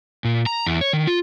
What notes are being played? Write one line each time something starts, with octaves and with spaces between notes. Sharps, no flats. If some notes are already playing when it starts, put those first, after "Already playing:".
A#2
A#5
E2
C#5
D#3
F4